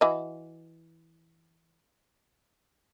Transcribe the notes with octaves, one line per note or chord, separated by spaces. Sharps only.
E3 F#4 D#5